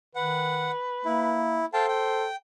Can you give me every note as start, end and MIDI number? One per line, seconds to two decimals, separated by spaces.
0.15 0.71 51
0.15 1.43 71
0.15 0.71 78
1.05 1.64 58
1.05 1.65 64
1.73 2.29 69
1.73 2.25 72
1.73 1.86 77
1.73 1.86 79
1.73 1.86 81
1.88 2.36 79